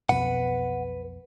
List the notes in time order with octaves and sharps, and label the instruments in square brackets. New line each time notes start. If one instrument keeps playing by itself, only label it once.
[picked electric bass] B1 F2 B2 [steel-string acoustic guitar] B4 [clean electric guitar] F#5